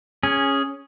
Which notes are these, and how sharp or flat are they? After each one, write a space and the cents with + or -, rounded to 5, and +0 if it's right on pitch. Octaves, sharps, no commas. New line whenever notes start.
C#4 +0 G#4 -5